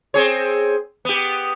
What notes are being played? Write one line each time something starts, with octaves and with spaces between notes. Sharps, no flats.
C4 G#4 C#5
B3 G4